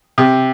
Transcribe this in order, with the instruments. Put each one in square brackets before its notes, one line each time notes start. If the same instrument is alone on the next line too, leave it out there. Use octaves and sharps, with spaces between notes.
[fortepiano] C3